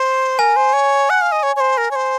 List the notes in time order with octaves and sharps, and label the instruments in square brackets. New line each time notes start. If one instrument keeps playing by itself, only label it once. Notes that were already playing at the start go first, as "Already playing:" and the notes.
Already playing: [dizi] C5
[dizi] A#4 [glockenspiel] G#5
[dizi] C5
C#5
F#5
F5
D#5
C#5
C#5
C5
A#4
C#5
C5